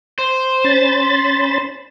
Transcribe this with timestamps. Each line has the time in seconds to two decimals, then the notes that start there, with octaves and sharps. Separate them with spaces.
0.19 C5
0.64 C#4 B5 A6